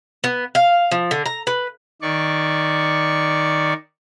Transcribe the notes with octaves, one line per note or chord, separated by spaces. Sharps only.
B3
F5
F3
D3
A#5
B4
D#3 D5 C#6